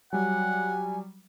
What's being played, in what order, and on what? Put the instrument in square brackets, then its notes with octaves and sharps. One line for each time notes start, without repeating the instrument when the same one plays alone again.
[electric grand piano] F#3 G3 [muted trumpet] F#5 [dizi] G#5